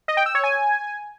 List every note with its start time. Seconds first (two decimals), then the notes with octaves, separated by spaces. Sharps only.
0.08 D#5
0.17 G5
0.26 E6
0.35 C#5
0.44 G#5